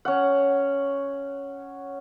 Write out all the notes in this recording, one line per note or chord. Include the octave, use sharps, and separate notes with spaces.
C#4 F#5